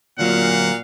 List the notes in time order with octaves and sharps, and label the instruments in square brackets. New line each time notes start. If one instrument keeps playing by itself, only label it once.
[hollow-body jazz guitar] D2 F#3 [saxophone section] A#2 [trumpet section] F5 F#5